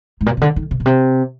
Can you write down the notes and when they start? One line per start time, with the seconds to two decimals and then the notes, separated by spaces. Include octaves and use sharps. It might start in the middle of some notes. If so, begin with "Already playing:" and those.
0.21 G#2
0.26 A#2
0.37 C3
0.41 D3
0.56 D#3
0.71 C3
0.80 A#2
0.86 C3